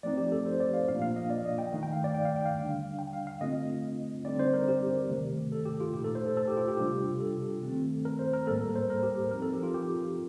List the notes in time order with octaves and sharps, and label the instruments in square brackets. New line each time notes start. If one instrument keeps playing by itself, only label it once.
[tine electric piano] F3 A3 C4 D#4 D5
G4
A4
C5
D5
F5
A#2 F3 A#3 D4 F4 F5
F5
D#5
D5
D#5
G5
D#3 A3 D#4
G5
F5
D5
G5
F5
G5
F5
D3 G3 D4
G5
F5
F5
D3 A3 C4 F4 D#5
D3 G3 C4 D#4 D5
C5
A#4
G4
C3 D#3 A3
A4
G4
F4
A#2 A3 D#4 G4
A4
C5
A4
A4
G4
F4
G4
C3 G3 D4 F4
A4
D#3 A3 C4
A#4
C5
A#4
A2 G3 A#3 A4
A#4
C5
A#4
G4
F3 C4 D#4 A#4
A4
G4
F4
G4